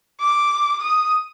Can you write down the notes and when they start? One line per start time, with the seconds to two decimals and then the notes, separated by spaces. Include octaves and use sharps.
0.21 D6
0.82 D#6